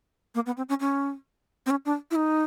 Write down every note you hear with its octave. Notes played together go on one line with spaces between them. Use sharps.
A#3
B3
C4
C#4
C#4
C4
C#4
D4
E4
D#4